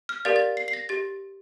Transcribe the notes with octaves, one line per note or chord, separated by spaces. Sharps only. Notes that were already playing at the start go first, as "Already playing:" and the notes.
F6
G4 A#4 D5 F5 A6
A6
C7
C7
A#6
G4 A6